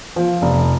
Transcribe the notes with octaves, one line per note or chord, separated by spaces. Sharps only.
F3
F1